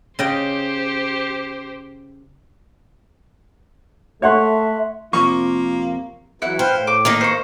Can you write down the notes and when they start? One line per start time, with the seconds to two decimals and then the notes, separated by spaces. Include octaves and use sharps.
0.19 C#3 G4 C5 D#5 G5
4.22 A3 C#5 E5 F#5 C6
5.13 F2 C3 A#3 F4 C#6
6.42 E3 F#3 E4 F#5
6.59 B4 C5 F5 G5
6.75 A2
6.87 D6
7.05 D#3 A#3 D#4
7.21 C5 C#6